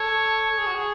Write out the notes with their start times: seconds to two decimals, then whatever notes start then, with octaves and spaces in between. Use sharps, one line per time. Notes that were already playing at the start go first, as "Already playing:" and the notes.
Already playing: A4 C#5
0.50 A4
0.58 G#4
0.66 F#4
0.75 G#4